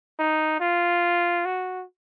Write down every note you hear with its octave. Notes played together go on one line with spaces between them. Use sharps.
D#4
F4
F#4